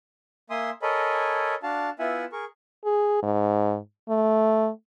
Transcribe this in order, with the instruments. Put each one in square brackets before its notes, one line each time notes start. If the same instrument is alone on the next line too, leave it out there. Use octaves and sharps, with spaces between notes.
[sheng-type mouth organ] A#3 E5 G#5 C6 D#6
A4 A#4 C#5 D#5 G#5 B5
D4 F#4 F5 A5
B3 E4 F4 E5 F#5 G#5
G#4 A#4 C#6
[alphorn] G#4
G#2
A3